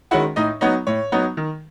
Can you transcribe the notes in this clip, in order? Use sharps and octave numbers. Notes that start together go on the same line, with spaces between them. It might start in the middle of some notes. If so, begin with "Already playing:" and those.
D#3 G#3 C#4 E4 F#4 F#5
A2 D#4 D#5
F#3 B3 D#4 C#5
A2 C#5
F#3 B3 D#4
D#3